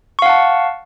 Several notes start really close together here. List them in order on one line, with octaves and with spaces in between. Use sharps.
C#6 F5 F#5 A5